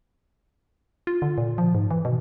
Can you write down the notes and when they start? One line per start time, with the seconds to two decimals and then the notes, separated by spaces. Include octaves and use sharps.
1.07 F4
1.22 D3
1.38 A#2
1.58 F3
1.75 G#2
1.91 E3
2.05 B2